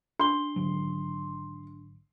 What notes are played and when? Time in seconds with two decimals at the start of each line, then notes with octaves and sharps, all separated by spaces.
0.19 D4 C6 G7
0.56 G#1 D3 F#3